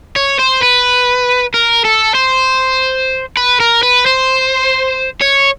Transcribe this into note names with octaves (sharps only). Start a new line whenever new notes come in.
C#5
C5
B4
A#4
A4
C5
B4
A#4
B4
C5
C#5